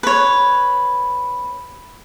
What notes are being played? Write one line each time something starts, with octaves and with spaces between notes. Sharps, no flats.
B4 C#5